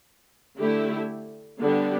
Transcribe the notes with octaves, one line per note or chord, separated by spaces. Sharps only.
D3 A3 E4 G4
D3 G3 B3 D4 G4